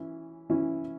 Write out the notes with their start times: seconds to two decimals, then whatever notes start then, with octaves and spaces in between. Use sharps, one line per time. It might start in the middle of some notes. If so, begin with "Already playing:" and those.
Already playing: E3 C#4 E4
0.50 E3 C#4 E4